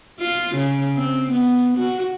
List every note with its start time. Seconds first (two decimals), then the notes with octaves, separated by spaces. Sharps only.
0.20 F4
0.55 C#3
0.95 C4
1.30 B3
1.78 F#4